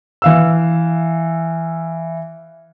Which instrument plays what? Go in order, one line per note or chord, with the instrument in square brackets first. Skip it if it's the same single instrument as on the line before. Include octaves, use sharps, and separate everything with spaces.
[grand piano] E3 F5 E6